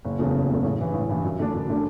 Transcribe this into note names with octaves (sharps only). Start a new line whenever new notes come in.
F#1
E2 C#3 F#3 A3
F#1
E2 C#3 F#3 A3
A1
G2 E3
A1
G2 E3
F#2
D3 A3 D4
F#2
D3 A3 D4